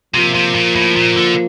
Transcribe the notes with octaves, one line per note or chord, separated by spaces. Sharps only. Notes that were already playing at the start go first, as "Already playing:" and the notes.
C3 F3 A#3 F4
C3
A#2
A2
A#2
D3